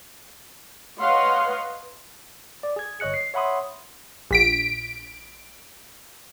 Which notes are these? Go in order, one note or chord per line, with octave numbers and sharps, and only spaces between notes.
B4 C#5 D#5 F5 F#5 C6
D5
G#4 G#6
G1 C#5 D#5 F#6 C#7
C7
C#5 E5 F#5 B5 C6 D#6
A#1 B6 D7